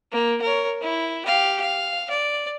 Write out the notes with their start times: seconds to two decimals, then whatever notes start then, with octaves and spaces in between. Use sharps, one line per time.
0.12 A#3
0.42 A#4 C#5
0.82 E4
1.26 G4 F5
1.61 F5
2.10 D5